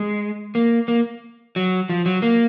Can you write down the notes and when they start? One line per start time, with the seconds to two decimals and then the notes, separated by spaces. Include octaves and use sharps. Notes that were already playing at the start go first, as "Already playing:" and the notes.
Already playing: G#3
0.55 A#3
0.88 A#3
1.56 F#3
1.89 F3
2.06 F#3
2.22 A#3